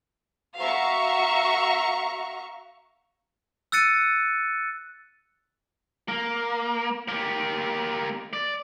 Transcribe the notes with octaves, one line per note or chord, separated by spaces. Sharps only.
F#4 E5 F5 A#5 C#6
E6 F#6 A6 C#7 D#7
A#3
A#3 G4
D5